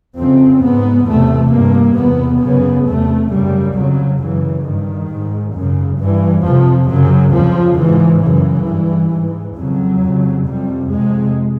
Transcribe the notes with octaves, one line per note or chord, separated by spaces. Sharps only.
F2 C#3 C4
G#2 B3
E2 C3 A3
G2 A#3
E2 C3 B3
F#2 C#3 B3
E2 C3 A3
F#2 C#3 G3
F2 C#3 F#3
F#2 C#3 E3
G2 D#3
G#2
F#2 C#3
G2 E3
F2 C3 F3
F#2 C#3 F#3
F2 C#3 F3
G#2 E3
F#2 C#3 E3
G2
G#2
F2 C#3 F#3
F2 C#3
F2 C3 G3
F2 C3 G#3